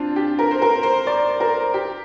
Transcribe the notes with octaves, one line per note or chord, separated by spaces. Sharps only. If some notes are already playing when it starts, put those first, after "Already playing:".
Already playing: C4 D4 F4
G4
A#4
C5
A#4
C5
D5
A#4
G4